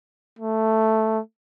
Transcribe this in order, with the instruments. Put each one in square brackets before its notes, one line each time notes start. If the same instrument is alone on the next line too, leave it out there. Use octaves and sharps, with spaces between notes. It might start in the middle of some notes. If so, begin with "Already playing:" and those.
[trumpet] A3